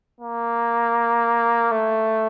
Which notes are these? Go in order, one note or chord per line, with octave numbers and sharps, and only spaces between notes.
A#3
A3